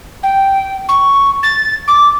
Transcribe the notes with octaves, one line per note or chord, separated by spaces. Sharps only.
G5
C#6
A6
D6